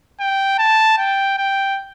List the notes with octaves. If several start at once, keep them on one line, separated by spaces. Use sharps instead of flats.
G5
A5
G5
G5